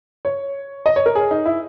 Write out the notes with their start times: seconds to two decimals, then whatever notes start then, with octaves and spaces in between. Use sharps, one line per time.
0.25 C#5
0.86 D#5
0.96 C#5
1.06 A#4
1.15 G#4
1.31 D#4
1.46 E4